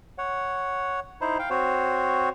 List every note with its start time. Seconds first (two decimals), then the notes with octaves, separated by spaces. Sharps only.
0.18 C#5 F#5
1.21 D#4 E4 C5
1.39 F5 G5
1.50 C4 F#4 C5 C#5